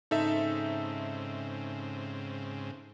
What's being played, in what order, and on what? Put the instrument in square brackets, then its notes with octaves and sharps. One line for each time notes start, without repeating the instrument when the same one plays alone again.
[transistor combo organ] G#2 C#3 C4 [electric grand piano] D#4 A4 E5